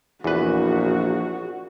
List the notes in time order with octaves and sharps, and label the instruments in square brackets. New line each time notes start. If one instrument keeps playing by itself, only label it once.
[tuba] A#1 [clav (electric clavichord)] E2 B4 [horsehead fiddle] F#4